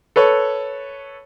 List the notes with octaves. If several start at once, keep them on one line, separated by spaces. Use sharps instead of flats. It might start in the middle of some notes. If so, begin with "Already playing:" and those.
A4 B4 C#5